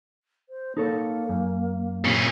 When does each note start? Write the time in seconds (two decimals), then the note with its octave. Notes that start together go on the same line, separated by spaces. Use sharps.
0.49 C5
0.77 A#3 D#4 A4 C#5
1.29 F#2
2.05 A#2 C#4